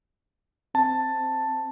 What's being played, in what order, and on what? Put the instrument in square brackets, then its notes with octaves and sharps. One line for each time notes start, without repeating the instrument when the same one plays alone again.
[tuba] C4 [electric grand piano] A5